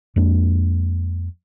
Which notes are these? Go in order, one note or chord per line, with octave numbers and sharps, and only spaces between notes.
F2 G#3 A#3 D4